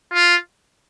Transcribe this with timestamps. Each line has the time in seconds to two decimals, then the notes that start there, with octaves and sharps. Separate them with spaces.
0.13 F4